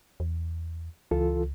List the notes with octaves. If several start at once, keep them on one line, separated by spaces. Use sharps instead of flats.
E2
C#2 E3 F4 A4